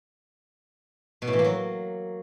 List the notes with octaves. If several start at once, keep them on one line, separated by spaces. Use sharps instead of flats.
B2
A2
E3
A#3
F#3